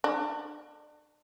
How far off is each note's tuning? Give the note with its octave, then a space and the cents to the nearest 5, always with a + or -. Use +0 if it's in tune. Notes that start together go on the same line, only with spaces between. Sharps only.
D4 +35